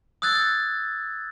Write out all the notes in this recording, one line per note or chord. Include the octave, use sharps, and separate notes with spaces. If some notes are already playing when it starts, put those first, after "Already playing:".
D#6 E6 F#6 G#6 A6